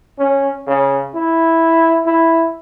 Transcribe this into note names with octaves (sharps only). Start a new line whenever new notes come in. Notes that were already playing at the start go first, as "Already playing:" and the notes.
C#4
C#3
E4
E4